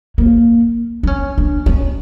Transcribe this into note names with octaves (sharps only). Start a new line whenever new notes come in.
A#3
D4
C#4
D4
C#4